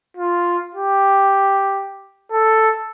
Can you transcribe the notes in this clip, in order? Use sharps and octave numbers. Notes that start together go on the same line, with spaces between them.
F4
G4
A4